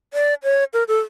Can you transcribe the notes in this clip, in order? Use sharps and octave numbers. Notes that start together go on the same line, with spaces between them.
D5
C#5
A#4
A4